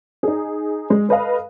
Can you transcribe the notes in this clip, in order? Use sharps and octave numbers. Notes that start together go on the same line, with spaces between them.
D#4 G#4
G#3
A4 B4 D#5 F5